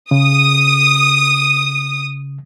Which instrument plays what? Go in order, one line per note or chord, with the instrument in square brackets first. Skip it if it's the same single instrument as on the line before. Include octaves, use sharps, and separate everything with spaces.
[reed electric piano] C#3 [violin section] D#6